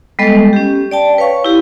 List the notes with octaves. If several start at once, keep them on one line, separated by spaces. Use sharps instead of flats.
G3 G#3 B3 A4 D#5
C#4 G4
D5 G5 A5
B4 C#5 F5 C#6
E4 G4